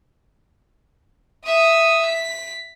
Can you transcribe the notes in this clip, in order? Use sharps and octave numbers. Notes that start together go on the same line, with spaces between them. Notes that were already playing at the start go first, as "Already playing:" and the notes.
E5 D#6
B6